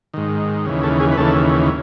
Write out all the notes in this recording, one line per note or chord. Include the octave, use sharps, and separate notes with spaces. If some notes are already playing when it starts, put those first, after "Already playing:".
G#2 D#3
D#2 C#3 E3
A4
G#4
B4
D#2 C#3 E3 A4